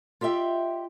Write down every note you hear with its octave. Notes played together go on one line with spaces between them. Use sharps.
F4 G4 D#5 E5 G5